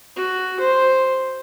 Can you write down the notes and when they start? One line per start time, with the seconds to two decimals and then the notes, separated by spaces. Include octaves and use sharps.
0.16 F#4
0.60 C5